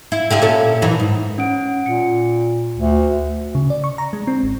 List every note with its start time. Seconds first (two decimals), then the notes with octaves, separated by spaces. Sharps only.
0.12 E4
0.30 D3 G4 E5
0.42 A#2 C#4 A4
0.82 F#2 D#3 E3
1.00 G#2
1.38 C#4 F#5 D7
1.86 A#2 C#7
2.76 D2
3.55 C#3
3.70 D5
3.84 C#6
3.98 A#5
4.13 G#3
4.27 C4
4.43 G#1